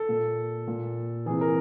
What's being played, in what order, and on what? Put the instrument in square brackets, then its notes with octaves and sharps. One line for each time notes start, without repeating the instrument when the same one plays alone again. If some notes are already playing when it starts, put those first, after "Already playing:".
Already playing: [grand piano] A4
A#2
A#2
C3 E3 G#4
A#4